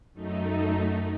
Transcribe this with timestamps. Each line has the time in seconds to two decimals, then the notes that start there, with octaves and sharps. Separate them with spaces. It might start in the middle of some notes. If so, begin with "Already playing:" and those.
0.14 F#2 A3 D#4